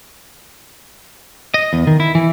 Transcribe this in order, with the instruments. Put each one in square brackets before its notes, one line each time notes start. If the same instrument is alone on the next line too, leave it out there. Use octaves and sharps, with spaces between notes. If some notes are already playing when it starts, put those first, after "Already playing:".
[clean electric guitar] D#5
E2
D#3
E4
E3